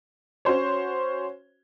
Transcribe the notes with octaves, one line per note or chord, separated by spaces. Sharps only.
C#4 F#4 C5 C#5